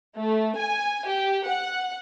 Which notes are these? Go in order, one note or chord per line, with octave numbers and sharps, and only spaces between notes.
A3
G#5
G4
F#5